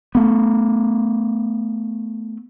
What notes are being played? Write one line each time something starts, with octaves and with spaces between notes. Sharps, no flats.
A3 B3